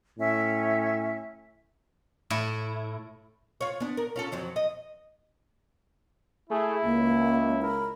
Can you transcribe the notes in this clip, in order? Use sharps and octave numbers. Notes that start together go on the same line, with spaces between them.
A2 C#4 E5
A2 E4
F4 C#5
B3 D4
A#4
C#4 F4 A4
F2 F3 F#3
D#5
A3 E4 G#4
C#2 A#3
A#4 B5